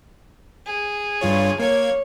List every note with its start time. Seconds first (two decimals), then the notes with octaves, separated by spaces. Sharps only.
0.66 G#4
1.21 G2 F4 C#5
1.59 A#3 C#5 G#6